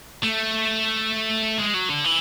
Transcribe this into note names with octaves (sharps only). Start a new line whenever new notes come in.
A3
G#3
F#3
D3
E3